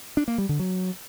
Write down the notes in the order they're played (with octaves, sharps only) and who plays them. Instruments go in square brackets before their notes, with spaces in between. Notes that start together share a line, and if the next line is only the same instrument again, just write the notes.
[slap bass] D4
A#3
G3
D3
F#3